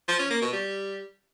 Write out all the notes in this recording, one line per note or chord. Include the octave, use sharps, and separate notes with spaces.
F3
C#4
A#3
B2
G3